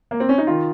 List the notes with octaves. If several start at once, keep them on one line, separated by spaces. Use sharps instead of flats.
A#3
C4
C#4
D#4
D#3 F4